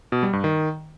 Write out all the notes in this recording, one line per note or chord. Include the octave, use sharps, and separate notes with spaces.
B2
G3
G2
D#3